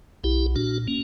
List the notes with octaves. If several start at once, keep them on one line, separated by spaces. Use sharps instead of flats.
B1 E4 G4
A#2 D4 F#4
A#3 C#4